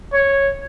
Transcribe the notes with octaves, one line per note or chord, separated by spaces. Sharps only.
C#5